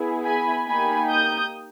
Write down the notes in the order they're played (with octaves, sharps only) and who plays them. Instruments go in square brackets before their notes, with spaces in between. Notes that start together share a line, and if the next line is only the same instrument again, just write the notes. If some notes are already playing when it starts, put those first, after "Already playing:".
Already playing: [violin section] B3 E4 G#4
G#5 B5
A#3 D#4 G4 G#5 B5
D#6 G6